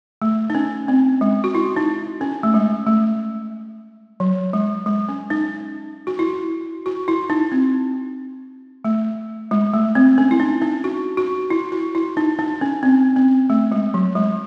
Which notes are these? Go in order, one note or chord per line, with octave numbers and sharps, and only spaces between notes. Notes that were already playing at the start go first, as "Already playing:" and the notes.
A3
D#4
C#4
C4
G#3
F#4
E4
D#4
C#4
A3
G#3
A3
F#3
G#3
G#3
C#4
D#4
F#4
E4
F#4
E4
D#4
C4
A3
G#3
A3
C4
C#4
E4
D#4
D#4
F#4
F#4
E4
F#4
E4
D#4
D#4
C#4
C4
C4
A3
G#3
F#3
G#3